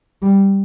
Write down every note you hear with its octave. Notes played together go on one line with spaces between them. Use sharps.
G3